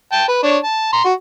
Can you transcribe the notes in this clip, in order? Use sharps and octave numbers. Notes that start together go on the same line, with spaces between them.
G5 A5
B4
D4 C#5
A5
A#5 C6
F#4